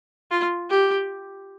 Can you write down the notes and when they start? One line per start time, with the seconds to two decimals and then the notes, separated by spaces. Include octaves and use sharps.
0.31 F4
0.70 G4